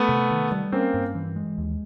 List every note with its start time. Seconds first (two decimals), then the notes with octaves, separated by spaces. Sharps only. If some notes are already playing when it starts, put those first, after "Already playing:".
Already playing: A3 B3
0.09 C3
0.31 D#3
0.52 G3
0.72 A#3 C4 C#4
0.94 G2
1.15 E3
1.36 G#3
1.58 D#2